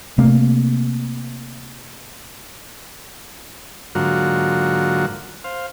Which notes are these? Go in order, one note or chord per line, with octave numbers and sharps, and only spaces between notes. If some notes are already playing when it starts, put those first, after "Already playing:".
C3 A3 A#3 C4
G#2 D3 F#3 A#3 F4 F#4
C5 F5